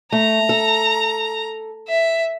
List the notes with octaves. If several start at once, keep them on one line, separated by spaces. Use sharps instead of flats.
A3 A#5
A4
E5